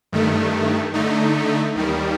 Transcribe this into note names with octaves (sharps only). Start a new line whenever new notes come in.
G2 D#3 A3
D3 A3 D#4
D#2 D#3 G3